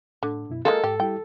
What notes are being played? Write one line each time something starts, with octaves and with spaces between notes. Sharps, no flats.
A2 D3
F#2 B2 E4
G#3 A#3 F4 A4 A#4 D#5
G#2 G4
G3 E4 G4 G5